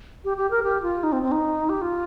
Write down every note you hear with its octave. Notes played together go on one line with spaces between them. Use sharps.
G4
G4
A#4
G4
F4
D#4
C4
C4
D#4
G4
F4